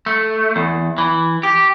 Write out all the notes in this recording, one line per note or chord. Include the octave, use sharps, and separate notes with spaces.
A3
E2
E3
G4